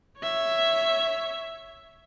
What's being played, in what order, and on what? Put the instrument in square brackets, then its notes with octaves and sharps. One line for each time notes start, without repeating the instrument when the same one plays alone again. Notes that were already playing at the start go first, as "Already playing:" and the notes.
[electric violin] C#5 E5